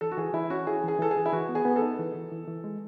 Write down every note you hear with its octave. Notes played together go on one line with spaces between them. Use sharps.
E3 A4
F#4
E3 G#4
E3 E4
C#4 F#4
E4 G#4
E3 G#4
E3 A4
G#4
E3
E4
E3 F#4
B3
G#4
B3
A4
D#4
E3
E3
E3
E3
G#3